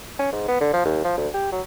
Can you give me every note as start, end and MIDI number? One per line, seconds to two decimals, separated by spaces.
0.19 0.28 61
0.32 0.44 44
0.48 0.57 59
0.61 0.73 50
0.74 0.84 53
0.85 1.01 39
1.05 1.17 53
1.17 1.28 38
1.34 1.48 67
1.52 1.61 54